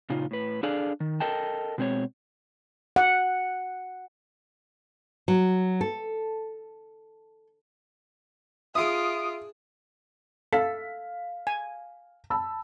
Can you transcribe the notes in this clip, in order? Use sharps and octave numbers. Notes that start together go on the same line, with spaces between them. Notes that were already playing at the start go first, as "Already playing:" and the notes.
A#2 C#3 D#4 F4
A2 B4
D4 G#4 A4 D5 F5
D#3
A4 A#4 D#5 G5 A5
B2 G#3 C4 A4 C#5
F#5
F#3
A4
D4 F4 G#4 E5 D#6 D7
A4 F5 B6
G#5
A5 B5 E6